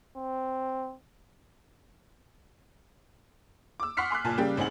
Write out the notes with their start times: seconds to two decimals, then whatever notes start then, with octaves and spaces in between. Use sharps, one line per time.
0.17 C4
3.80 D6 E6
3.97 F#5 C6 C#6 F6 B6 C7
4.10 G#5 C6 D6 F#6
4.24 F#1 A#2 G#5 A5
4.38 C#3 G3 A#3 G4 G5
4.57 A1 C4 D#4 G#4 F#5 F#7